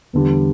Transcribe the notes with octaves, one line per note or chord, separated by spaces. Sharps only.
E2 D3 G3